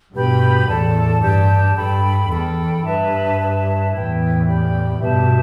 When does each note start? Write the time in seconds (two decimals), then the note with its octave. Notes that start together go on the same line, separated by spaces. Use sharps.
0.13 G2 B2 G4 B4 G5 B5
0.67 E2 A2 A4 D5 A5
1.21 G2 G4 D5 A5
1.75 G2 A4 G5 B5
2.29 E2 A4 G5 B5
2.84 G2 B4 E5 A5
3.38 B4 E5 A5
3.92 E2 A2 E4 B4 G5
4.45 G4 D5 G5 B5
4.99 G2 B2 G4 B4 E5 A5